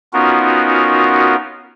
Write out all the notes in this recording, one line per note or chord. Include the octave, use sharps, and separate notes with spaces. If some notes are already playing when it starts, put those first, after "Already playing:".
B3 C#4 D#4 F4 F#4 A#4